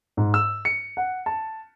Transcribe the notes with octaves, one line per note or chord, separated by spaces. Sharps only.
G#2
E6
C#7
F#5
A5